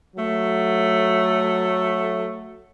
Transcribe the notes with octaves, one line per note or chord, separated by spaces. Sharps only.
F#3 A3